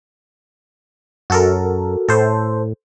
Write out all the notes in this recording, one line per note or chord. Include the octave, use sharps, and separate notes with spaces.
F#2 F#4 A4 A#4
A2 A4 C5